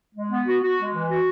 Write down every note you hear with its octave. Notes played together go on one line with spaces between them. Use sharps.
G#3
B3
F#4
F#4
G#3
E3
F#4